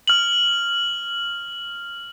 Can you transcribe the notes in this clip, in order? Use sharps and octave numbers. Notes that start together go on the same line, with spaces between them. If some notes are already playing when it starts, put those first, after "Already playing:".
F6 F#7